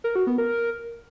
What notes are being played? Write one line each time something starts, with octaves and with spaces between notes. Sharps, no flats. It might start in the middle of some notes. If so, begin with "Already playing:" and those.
A#4
F#4
B3
A#4